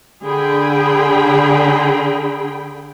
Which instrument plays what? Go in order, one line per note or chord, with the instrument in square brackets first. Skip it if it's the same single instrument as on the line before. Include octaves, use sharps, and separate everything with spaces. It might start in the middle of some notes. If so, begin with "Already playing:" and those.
[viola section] D3 G#4 G5 B5